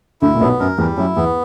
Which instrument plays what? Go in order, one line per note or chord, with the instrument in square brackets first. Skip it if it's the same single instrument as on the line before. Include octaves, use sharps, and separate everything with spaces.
[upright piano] D2 D3 [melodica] E4
[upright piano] A#2
[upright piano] B1 B2 [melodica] B3
[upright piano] F#2 [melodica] A#4
[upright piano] E2 E3 [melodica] G3
[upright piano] F#2 F#3 [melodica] E4
[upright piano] E2 E3 [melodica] B3